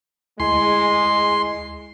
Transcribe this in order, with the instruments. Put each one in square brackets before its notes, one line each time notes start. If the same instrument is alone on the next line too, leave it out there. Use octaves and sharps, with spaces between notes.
[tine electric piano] D2 E4 G#5 [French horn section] G#3 [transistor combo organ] C6